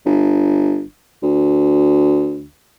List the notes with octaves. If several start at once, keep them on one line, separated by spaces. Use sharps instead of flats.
G1
D2